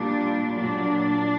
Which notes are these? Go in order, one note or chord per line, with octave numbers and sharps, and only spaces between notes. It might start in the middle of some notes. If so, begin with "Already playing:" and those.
Already playing: A#2 G3 D4
A#2 F#3 D4